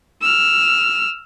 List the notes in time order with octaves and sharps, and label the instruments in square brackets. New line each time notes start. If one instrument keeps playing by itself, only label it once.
[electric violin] E6 F6